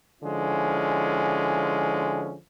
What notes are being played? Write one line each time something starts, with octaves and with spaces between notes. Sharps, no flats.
D3 F3 G#3 C#4 E4